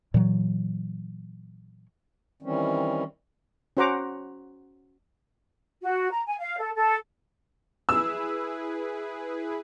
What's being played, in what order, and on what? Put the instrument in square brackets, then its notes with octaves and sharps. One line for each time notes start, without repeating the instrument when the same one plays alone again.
[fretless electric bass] A#2 E3 F#3
[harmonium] D#3 E3 G3 C4 C#4
[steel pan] C#4 F#4 C5 F#5 A#5 D6
[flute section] F#4
A#5
G#5
F5
A4
A4
[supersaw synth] E4 G#4 B4 [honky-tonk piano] E6